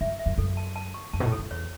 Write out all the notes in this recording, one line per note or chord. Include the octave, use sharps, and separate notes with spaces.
F#2 E5
E5
F#2
F#2 A4
A5
A5
C#6
F#2 A5
B2
A2
A4
F#2
E2 C#5